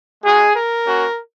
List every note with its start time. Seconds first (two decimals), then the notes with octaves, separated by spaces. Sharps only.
0.24 G#3 D#4 F#4 G#4
0.54 A#4
0.84 A#3 C#4 F#4